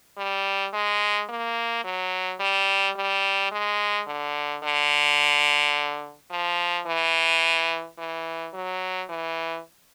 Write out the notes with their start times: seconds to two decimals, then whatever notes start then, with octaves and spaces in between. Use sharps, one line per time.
0.17 G3
0.73 G#3
1.29 A#3
1.84 F#3
2.40 G3
2.96 G3
3.51 G#3
4.07 D3
4.63 D3
6.30 F3
6.86 E3
7.98 E3
8.54 F#3
9.09 E3